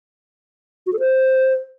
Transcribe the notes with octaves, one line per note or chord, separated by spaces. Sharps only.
F#4
A4
C5